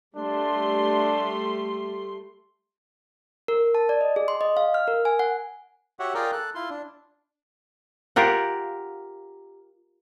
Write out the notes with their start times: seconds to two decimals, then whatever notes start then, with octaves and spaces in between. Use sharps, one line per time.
0.16 G3 A3 D4 C6
3.48 A#4
3.75 A5
3.89 D5
4.01 D#5
4.16 G#4
4.28 C6
4.41 D#5
4.57 F5
4.74 F6
4.87 A#4
5.05 G#5
5.19 F#5
5.99 F#4 G4 C#5 E5 F#5
6.14 F4 G#4 A#4 D5 G5 A#5
6.32 A4 F#6
6.55 E4 F4 C6
6.70 D4
8.16 F4 G4 A#4 F#5